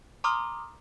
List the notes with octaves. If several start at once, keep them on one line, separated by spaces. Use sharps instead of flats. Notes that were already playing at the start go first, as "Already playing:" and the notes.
A#5 C6 D6 D#6 F6